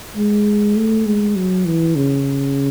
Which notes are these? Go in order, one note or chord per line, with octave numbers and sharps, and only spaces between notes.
G#3
A3
G#3
F#3
E3
C#3